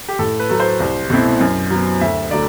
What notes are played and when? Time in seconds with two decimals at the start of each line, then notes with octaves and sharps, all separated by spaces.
0.09 G4
0.19 A2 A4
0.40 B4
0.49 F#3 A3
0.60 C5
0.80 C2
1.10 B2 A3 C4 E4
1.41 F#2
1.71 F#3 B3
2.01 D2 E5
2.31 D3 F#3 A3 D5